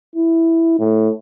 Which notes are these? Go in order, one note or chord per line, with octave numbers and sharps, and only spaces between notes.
E4
A2